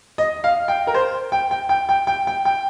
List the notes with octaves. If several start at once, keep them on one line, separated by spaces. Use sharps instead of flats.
D#5
F5
G5
A#4
C5
G5
G5
G5
G5
G5
G5
G5